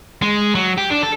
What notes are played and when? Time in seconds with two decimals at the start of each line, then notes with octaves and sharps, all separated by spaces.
0.22 G#3
0.55 F#3
0.78 G4
0.91 D4
1.03 A4